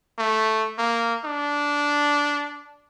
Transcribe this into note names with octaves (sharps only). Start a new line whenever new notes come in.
A3
A#3
D4